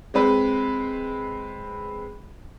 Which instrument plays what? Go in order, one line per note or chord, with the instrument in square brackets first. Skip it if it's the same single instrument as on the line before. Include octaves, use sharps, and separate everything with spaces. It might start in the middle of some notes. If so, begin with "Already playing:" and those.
[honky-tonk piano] G#3 C4 B4